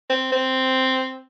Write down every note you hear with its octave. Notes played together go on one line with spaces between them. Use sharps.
C4
C4